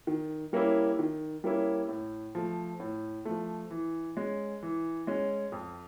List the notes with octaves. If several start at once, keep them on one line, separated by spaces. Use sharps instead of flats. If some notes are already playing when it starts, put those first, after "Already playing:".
D#3
G3 A#3 C#4 E4
D#3
G3 A#3 C#4 E4
A2
F3 A3
A2
F3 A3
E3
G#3 C#4
E3
G#3 C#4
F2